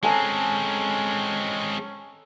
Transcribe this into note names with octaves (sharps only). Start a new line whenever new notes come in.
G#3 C4 C#4 A4 G#5 A#5